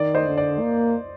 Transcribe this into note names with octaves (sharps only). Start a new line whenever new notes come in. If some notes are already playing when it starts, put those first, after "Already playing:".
Already playing: D#3 D5
C5 D#5
D3
D5
A#3